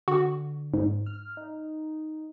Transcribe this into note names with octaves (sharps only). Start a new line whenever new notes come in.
D3 F#4
G#2
F6
D#4